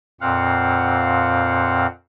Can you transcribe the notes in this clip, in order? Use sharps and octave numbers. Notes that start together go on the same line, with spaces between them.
F2 A#2 C4 F5 F#5